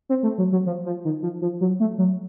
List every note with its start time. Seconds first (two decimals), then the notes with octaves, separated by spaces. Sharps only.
0.09 C4
0.23 A3
0.38 F#3
0.52 F#3
0.66 F3
0.86 F3
1.05 D#3
1.23 F3
1.42 F3
1.61 F#3
1.80 A3
1.98 F#3